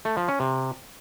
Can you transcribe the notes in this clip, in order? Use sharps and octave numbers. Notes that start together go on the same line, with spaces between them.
A3
F3
C#4
C3